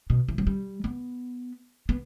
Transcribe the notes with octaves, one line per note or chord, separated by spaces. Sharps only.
B2
E3
F#3
G3
B3
B3